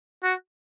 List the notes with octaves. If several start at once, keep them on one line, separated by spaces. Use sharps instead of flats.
F#4